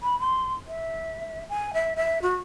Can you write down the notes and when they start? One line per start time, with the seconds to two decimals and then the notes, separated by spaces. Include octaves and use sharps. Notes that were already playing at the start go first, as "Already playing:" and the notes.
0.03 B5
0.20 C6
0.67 E5
1.49 G#5
1.74 E5
1.96 E5
2.22 F#4